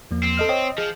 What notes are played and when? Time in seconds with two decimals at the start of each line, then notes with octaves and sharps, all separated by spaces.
0.11 E2 F3 A#3
0.23 C4
0.37 A4 D#5 F6
0.49 C5 C#5 D#5 G5
0.78 F3 G#4